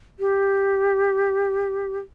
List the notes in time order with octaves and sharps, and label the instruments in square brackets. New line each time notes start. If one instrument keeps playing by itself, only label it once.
[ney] G4